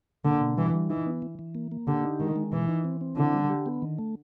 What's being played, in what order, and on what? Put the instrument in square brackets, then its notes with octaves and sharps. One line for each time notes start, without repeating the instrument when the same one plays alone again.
[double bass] D3 [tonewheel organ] A#3
[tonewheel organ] B2
[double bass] E3 [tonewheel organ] G3
[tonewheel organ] G3
[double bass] E3 [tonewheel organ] D#4
[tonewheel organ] B3
E3
E3
A#3
A#3
[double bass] D3 [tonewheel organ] G4
[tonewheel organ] D#4
[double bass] D#3 [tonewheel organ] G#3
[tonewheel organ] G#3
[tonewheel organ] B2 [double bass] E3
[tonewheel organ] D#4
C4
C4
[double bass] D3 [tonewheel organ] E4
[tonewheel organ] G3
G4
B3
D#3
A3